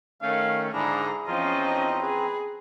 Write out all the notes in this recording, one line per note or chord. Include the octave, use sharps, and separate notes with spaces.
D#3 A3 C#4 F5
G#2 D3 D4 E4 G#4 A#5
E2 F3 C4 C#4 F4 D#5 A#5
D#4
G#4 B4